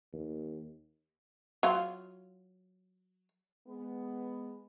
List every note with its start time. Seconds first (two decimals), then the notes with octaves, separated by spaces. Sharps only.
0.13 D#2
1.63 F#3 F4
3.67 G#3 B3